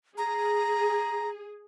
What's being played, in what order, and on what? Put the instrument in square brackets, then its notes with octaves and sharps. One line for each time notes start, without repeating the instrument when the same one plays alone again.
[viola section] G#4 [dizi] A#5